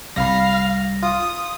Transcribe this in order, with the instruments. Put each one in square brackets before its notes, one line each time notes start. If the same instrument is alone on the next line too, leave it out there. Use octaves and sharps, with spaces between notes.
[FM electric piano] C2 A#6 [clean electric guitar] G3 B5 [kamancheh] F5
[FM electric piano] F4 [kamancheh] D#6